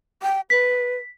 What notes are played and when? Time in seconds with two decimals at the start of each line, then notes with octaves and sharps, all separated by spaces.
0.23 G5
0.50 B4 B6